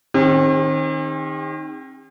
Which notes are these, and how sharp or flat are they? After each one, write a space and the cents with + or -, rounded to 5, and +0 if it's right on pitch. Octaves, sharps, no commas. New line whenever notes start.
D#3 +0 C4 +40 G#4 -45